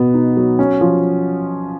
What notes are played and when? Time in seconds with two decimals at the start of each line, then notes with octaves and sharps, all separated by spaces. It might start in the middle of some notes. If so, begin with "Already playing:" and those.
Already playing: B2 B3
0.14 D#4
0.37 F#3
0.59 C#4
0.81 F3